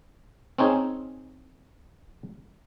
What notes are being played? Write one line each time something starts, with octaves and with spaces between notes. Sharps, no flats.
C4 C#4 D#4 G#4